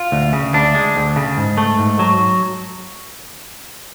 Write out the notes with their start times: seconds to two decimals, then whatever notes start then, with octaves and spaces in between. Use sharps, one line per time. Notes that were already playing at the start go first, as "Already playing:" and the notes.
Already playing: F4
0.12 D2
0.33 C#3
0.54 D2 D4
0.75 G#3
0.96 D2
1.16 C#3
1.37 G#2
1.57 A3
1.79 G#2
1.99 F#3